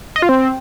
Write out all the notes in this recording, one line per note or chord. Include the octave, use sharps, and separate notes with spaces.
D#5
F4
C4